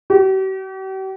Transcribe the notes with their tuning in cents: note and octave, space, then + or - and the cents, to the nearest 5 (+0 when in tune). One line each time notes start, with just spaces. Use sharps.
G4 -45